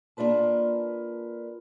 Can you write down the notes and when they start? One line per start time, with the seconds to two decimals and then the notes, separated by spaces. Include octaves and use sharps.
0.17 A#3 D4 F4 B4 A5